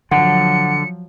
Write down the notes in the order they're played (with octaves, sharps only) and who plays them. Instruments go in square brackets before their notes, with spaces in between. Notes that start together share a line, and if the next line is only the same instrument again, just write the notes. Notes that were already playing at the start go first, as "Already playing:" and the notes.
[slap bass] D3 [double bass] F3 F#3 [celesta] F#5 [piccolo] C#7